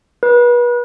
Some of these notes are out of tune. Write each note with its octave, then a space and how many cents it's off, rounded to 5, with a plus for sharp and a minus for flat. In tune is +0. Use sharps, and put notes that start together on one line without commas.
B4 -35